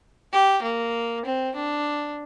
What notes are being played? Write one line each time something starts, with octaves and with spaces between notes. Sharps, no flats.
G4
A#3
C4
D4